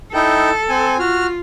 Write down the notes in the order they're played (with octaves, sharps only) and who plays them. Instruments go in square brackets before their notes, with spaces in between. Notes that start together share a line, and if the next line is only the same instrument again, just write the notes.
[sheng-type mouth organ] D#4 E4 G5 [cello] A4
[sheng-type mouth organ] C4 G#5
[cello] F4 [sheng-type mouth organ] F#4 F6